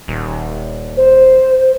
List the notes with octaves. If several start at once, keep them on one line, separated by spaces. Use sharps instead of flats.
D#1
C5